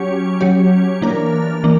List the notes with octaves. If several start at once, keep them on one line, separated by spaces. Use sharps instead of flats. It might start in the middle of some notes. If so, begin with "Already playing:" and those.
Already playing: F#3 C#4 G4 C#5
F#3 C#4 G4 C#5
E3 A#3 D4 A#4
E3 A#3 D4